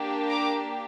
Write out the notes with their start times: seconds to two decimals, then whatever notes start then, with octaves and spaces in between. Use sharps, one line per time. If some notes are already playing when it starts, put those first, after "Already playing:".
Already playing: A#3 D4 G4
0.29 A#5 D6